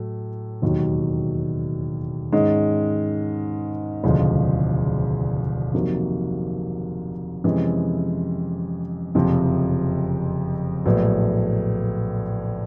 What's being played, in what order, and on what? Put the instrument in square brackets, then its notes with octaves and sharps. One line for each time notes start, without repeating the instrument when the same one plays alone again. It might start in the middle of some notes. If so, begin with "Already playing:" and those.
Already playing: [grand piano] A2 F#3 A3
E1 D#2 D#3 F#3
G#2 D#3 G#3 C#4
E1 D2 C#3 F3 G#3
F2 C3 D#3 F#3 A#3
F2 C3 E3 G#3 C#4
F#1 F2 C3 F3
A#1 A2 F#3 B3